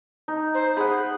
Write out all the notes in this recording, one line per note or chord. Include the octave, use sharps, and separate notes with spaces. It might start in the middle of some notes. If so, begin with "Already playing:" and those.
D#4
C5
G#4 F#5 B5